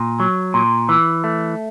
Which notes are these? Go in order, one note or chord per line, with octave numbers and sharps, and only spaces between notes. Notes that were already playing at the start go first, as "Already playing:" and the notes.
Already playing: A#2
F#3
A#2
E3
A3